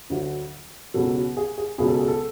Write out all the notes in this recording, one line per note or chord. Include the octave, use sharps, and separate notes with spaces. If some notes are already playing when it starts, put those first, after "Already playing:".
D2 D3 F#3
C#2 B2 F#3 A4
F#4
G#4
G#4
C#2 B2 F#3 G#4
A4
G#4
A4